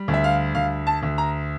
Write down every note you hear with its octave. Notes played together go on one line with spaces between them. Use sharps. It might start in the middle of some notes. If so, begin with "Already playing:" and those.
Already playing: G3
D2
E5
F5
D2 F5
A5
D2
A#5